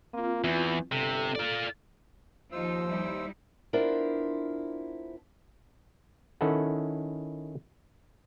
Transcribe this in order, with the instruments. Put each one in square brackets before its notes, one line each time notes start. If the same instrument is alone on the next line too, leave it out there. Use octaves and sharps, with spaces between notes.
[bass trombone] A#3 [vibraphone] C4 F4
[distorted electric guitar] E2 [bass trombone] E3
[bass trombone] G1 [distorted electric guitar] C3 [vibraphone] A4
[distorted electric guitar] F4 D5
[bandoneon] D#2 C5 E6 [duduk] F3 [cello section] D#4 F4
[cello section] G3 D#4 E4
[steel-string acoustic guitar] B3 D4 E4 F4 A#4 C5
[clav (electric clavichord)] D#3 C#4 E4 A4 B4 F#5